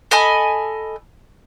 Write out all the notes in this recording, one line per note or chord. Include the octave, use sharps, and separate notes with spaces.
A4 D#5 G#5 B5